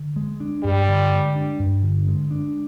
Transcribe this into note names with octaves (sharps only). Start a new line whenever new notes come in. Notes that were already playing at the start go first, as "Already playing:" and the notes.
Already playing: D3
G#3
D4
G2 G3
D3
G#3
D4
G2
D3
G#3
D4